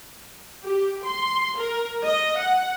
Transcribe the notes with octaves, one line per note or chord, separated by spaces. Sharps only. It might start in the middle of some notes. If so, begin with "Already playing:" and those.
G4
C6
A#4
D#5
F#5